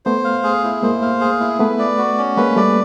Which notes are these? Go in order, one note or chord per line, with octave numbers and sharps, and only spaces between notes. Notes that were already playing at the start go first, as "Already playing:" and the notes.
A3 B3 C5
F5
G#4
E4
G#3 A#3 C5
F5
G#4
E4
A3 B3 B4
D5
F#4
C#4
G#3 A#3 B4
G3 A3 D5